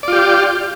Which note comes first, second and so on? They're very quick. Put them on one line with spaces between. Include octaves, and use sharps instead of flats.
D5 F4 G4